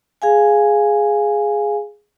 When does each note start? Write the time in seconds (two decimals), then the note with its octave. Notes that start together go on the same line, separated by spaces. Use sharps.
0.22 G#4 F5 G#5